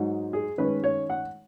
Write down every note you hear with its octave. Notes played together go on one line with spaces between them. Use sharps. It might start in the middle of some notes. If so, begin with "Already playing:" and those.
Already playing: G#2 F#3 D#4
G#4
D#3 G#3 C#4 B4
C#5
F#5